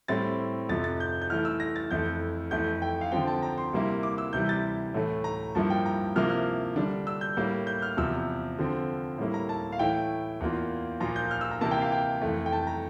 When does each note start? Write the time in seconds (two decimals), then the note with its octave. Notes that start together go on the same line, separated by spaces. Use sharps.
0.08 A2 G3 C4 E4 A6
0.69 F2 C3 F3 A6
0.84 A6
1.00 G6
1.22 G6
1.30 E3 A3 E4 F6
1.45 E6
1.60 A#6
1.76 A6
1.91 F2 E3 A3 E4 G6
2.51 F2 E3 A3 E4 G6
2.82 G5
3.01 F5
3.11 D3 F3 C4 G5
3.27 A5
3.42 A#5
3.58 C6
3.73 C3 G3 A#3 E4
4.03 D6
4.18 E6
4.33 C3 E3 G3 G6
4.49 A6
4.94 A2 E3 A3
5.24 A#5
5.55 G2 F3 A#3 E4 A5
5.70 G5
5.86 A#5
6.15 C3 F3 A#3 E4 F6
6.30 F6
6.76 D3 G3 D4
7.07 E6
7.21 G6
7.37 A2 G3 A#3 E4
7.67 G6
7.82 F6
7.97 E2 C3 F3 E6
8.59 D3 F3 C4
9.18 A2 G3 A#3 E4
9.34 A#5
9.49 A5
9.72 F5
9.79 A2 E3 A3 E4 G5
10.40 E2 E3 A#3 F4
11.00 A#2 F3 A#3 F4 A#5
11.16 G6
11.31 F6
11.41 E6
11.51 A#5
11.61 C3 E3 A#3 E4 A5
11.71 G5
11.82 F5
11.92 G5
12.22 F2 E3 A3
12.46 G5
12.53 A5
12.67 A#5